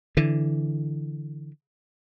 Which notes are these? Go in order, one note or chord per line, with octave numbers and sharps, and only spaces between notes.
D3 E3